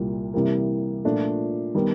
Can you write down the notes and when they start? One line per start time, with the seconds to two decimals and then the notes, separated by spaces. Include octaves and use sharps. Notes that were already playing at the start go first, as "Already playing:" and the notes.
Already playing: C2 A#2 G3
0.34 C3 E3 G3 A#3
1.05 A#2 F3 A3 D4
1.75 D#3 G3 B3